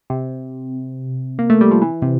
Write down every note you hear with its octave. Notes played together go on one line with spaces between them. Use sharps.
C3
A#3
A3
G3
F3
E3
C3